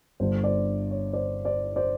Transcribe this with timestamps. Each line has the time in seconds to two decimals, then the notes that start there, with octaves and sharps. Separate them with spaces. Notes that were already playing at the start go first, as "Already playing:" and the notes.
0.20 G1 G2 D3 C5
0.43 C5 D5
0.91 C#5
1.13 C5 D5
1.45 C5 D5
1.76 C5 D5